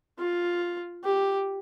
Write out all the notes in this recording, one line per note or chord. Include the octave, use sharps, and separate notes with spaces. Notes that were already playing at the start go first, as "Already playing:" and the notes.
F4
G4